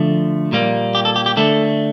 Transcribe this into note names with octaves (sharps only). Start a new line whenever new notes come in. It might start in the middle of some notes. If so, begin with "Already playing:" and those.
Already playing: D3 F3 A3
A#2 G3 A#3
G4
A4
G4
G4
D3 A3 A4